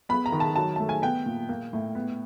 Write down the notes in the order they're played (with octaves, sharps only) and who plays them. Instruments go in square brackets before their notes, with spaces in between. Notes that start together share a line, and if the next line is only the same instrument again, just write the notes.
[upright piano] B3 B5
A#5
D#3
A5
F#3 A5
A3 A5
G#5
B3 G5
A#2
A#3
A2
B3